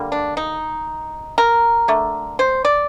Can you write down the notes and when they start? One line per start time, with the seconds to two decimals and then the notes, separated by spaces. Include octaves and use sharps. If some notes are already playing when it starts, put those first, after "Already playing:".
Already playing: D3 G3 A#3
0.12 D4
0.37 D#4
1.38 A#4
1.88 D3 A3
2.39 C5
2.65 D5